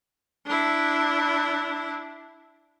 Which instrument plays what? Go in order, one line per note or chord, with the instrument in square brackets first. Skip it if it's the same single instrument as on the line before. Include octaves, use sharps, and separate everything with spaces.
[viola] D4 E4